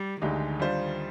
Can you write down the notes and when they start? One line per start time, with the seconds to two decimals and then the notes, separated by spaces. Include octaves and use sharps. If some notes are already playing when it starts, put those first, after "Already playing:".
Already playing: G3
0.22 D2 D3 D#3 G#3 D#4 G4
0.60 G3 D4 F4 C5